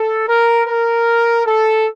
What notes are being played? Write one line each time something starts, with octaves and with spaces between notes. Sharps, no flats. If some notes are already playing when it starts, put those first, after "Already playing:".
Already playing: A4
A#4
A#4
A4